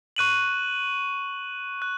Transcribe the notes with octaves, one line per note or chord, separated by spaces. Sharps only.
C#6 F#6 D#7 F#7
F#6